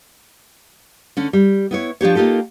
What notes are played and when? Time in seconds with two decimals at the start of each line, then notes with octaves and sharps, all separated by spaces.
1.17 D3 C#4
1.33 G3
1.71 B3 E4 C#5
2.01 F3 D4 G4 C#5
2.15 A#3 D#4 F4 G4 A4